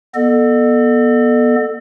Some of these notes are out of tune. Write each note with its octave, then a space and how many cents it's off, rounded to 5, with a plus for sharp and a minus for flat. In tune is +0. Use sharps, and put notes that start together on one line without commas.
B3 -25 A4 +0 D#5 -45